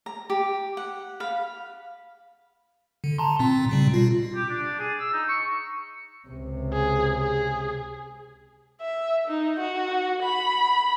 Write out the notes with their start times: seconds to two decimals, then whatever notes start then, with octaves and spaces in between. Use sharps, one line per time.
0.06 A#5
0.30 G4
0.77 F#5
1.20 F5 B5
3.04 D3
3.18 A5 A#5 C6
3.39 A#2 C4
3.70 A#2 C#3 G3
3.93 B2 F4
4.35 G4
4.49 D4
4.79 G#4
4.99 E6
5.13 D#4
5.29 C#6
6.29 C#2 C3
6.73 G#4
7.18 G#4
8.81 E5
9.27 D#4
9.59 F#4
10.23 B5